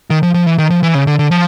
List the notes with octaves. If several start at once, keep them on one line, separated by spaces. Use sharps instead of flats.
D#3
F3
F3
E3
D#3
F3
E3
C#3
D3
D3
F3